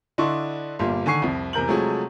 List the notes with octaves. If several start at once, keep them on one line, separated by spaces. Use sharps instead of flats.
D3 D4 E4 D#5 C6 C#6
G1 A#2 G3 A#3 C6
D3 D#3 G#5 C#6 C7
C2 F2
E2 C3 A#4 G6 F#7
C3 F3 F#3 G#3 A3 G#4